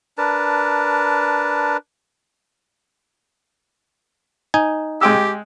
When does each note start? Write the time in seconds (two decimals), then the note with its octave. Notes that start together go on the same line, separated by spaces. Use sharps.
0.18 D4 A#4 B4 A5
4.54 D#4 G#5
5.01 G#3 G4 G5 E6